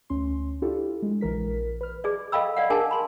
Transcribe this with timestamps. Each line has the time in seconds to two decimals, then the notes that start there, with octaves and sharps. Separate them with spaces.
0.10 D2 C#4 C6
0.62 D4 E4 F4 G4 A4
1.02 G#3
1.21 A#1 E3 A#4 B6
1.81 B4 F6
2.04 G#4 D5
2.32 A4 D#5 F5 G5 B5 E6
2.57 D5 F5 F#5
2.70 D4 G#4 A#4 G#5 A5
2.91 B5 C6